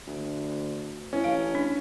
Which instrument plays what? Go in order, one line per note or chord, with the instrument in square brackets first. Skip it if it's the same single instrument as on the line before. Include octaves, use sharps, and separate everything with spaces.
[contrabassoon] D2
[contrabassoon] A2 [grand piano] C#4
[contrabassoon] A1 [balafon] F5
[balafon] D4